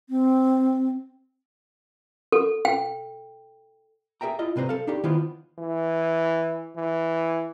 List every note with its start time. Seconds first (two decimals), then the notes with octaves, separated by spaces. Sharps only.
0.09 C4
2.32 A4
2.65 G5
4.21 G#4 A#4 E5 G5 A#5
4.39 E4 F4 D#5
4.56 C2 C3 B4 C5 A#5
4.69 A4 F5
4.87 D4 D#4 G4
5.04 D#3 B3 E4 F4 C5
5.59 E3
6.76 E3